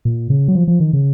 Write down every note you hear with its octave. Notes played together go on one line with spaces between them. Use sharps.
A#2
C#3
F#3
F3
F3
D#3
C#3